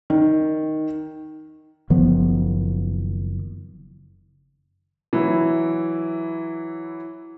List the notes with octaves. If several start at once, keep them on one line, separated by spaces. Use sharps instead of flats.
D#3
F#1 D#3 F3 B3
E3 F#3 E4